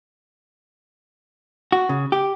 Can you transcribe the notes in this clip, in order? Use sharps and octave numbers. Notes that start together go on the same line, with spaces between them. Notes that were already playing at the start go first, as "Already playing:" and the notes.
F#4
C#3
G4